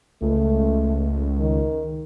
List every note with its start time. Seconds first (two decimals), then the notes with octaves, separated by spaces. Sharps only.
0.22 C#2 A3
1.39 D#3